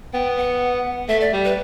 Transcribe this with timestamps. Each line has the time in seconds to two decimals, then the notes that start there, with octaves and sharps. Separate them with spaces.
0.13 B3 G5
0.37 F#5
1.09 A3 E5
1.21 D5
1.33 G3
1.45 B4